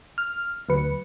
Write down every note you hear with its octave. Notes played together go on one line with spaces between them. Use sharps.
F6
D2 F#3 B4 C#7